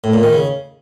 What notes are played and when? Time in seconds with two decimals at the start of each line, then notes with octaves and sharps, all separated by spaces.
0.04 A2
0.14 A#2
0.23 D#3
0.33 C#3